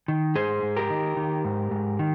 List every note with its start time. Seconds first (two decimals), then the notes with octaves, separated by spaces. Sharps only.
0.08 D#3
0.35 G#2 G#4 C5
0.63 G#2
0.76 G4 A#4
0.90 D#3
1.17 D#3
1.45 G#2
1.71 G#2
1.99 D#3